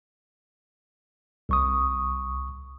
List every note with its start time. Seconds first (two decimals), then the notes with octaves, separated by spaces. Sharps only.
1.49 C2 C#6 D#6